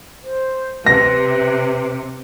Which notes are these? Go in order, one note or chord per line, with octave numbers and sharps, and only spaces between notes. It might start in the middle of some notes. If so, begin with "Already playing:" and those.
C5
C3 B4 A#6